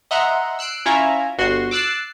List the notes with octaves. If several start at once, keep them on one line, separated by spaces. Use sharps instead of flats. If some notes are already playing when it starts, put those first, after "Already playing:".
D#5 E5 F#5 A#5 C6
E6 F#6 C7 D7
C#4 E4 F4 E5 G#5 A#5
G1 F#4 C6
D6 E6 F#6 A6 C7